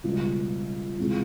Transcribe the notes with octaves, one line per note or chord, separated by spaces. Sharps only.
C#2 B2 G3
C#2 C3 E3 G#3